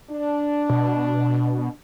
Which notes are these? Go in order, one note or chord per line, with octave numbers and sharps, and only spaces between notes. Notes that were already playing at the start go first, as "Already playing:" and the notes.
D4
B2